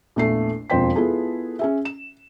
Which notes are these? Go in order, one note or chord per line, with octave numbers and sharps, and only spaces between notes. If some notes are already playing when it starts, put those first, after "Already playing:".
A#1 E2 A3 A4 C7
E1 F2 F3 C5 G5 B6
B3 E4 F4 G#4 A4
C#4 G#4 E5
E7